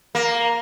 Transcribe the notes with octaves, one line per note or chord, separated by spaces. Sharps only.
A#3